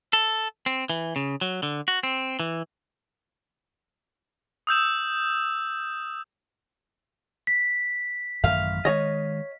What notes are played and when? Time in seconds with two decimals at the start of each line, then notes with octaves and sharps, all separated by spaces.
0.13 A4
0.66 C4
0.90 E3
1.16 C#3
1.41 F#3
1.63 D3
1.88 F#4
2.03 C4
2.40 E3
4.67 D#6 E6 G6 E7
7.47 B6
8.44 A1 F#2 D#3 F5
8.85 D#3 G#3 C#5 D#5